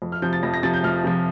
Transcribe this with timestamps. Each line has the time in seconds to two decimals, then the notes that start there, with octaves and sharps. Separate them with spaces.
0.02 F2
0.12 F6
0.22 C3 F3 G6
0.33 A6
0.43 F2 A#6
0.54 A#6
0.63 C3 F3 A6
0.74 G6
0.84 F2 F6
1.04 C3 F3